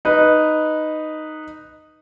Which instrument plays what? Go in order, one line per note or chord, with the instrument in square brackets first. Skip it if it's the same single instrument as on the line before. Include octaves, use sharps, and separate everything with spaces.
[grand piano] D#4 B4